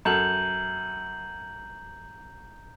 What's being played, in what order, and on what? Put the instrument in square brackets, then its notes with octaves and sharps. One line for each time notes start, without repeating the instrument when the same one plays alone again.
[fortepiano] F#2 A4 [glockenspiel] A#5 G6 F#7